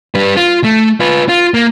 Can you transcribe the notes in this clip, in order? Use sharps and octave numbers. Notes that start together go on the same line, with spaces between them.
G3 B4
F4
A3
F4 B4
F4
A#3